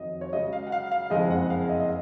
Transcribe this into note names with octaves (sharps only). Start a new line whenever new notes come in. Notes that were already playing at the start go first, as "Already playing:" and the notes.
Already playing: F2 D#3 F#3 D#5
C#5
C#2 C#3 F#3 D#5
F5
F#5
F5
F5
F#1 F2 F3 G#3 D#5
F#5
F5
D#5
D#5